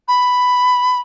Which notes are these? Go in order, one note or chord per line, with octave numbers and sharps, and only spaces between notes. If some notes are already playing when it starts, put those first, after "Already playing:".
B5